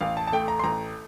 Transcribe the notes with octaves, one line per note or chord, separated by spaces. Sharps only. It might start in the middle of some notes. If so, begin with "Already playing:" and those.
A1 F5
A5
A5
A3 G5
A#5
C6
A1 A#5